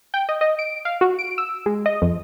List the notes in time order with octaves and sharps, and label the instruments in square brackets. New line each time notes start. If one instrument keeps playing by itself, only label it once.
[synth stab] G5
D#5
D#5
D7
F5
F#4
D7
E6
G#3
D#5
F2